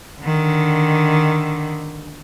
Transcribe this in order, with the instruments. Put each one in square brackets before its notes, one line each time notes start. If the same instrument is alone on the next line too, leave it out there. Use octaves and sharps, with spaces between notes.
[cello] D3 D#3